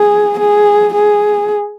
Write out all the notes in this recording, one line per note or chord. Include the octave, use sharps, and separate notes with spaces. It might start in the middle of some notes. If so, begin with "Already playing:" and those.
Already playing: G#4
G#4
G#4